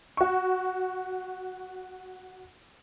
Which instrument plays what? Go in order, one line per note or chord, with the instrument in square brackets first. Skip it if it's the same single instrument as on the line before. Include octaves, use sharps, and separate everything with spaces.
[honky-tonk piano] F#4 C#6